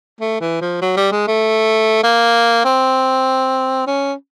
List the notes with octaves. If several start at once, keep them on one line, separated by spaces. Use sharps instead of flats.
A3
E3
F3
F#3
G3
G#3
A3
A#3
C4
C#4